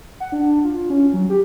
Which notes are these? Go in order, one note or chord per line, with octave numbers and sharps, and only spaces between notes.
F#5
D4
F4
C#4
F#3
G4